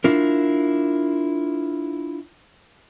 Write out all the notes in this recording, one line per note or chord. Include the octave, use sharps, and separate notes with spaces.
D4 E4 F4 A#4